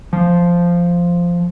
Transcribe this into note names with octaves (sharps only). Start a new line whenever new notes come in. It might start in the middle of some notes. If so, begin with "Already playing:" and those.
F3